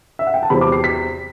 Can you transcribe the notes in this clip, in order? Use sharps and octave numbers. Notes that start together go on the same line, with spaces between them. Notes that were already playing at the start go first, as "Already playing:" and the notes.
E5
F#5
G5
A5
E2 C3 F#3 C4 E4 B5
D6
C7
B6